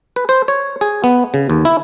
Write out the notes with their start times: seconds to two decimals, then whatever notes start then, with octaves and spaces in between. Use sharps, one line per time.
0.16 B4
0.29 C5
0.48 C#5
0.81 G#4
1.04 B3
1.34 C#3
1.50 D#2
1.65 E4